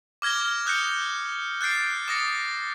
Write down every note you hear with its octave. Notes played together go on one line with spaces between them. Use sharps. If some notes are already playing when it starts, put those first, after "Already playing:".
D6 F6 G#6 A#6 G7
D#6 F#6 G6 A#6 C#7
F#6 G6 A6 C7 D7
D6 D#6 A#6 C#7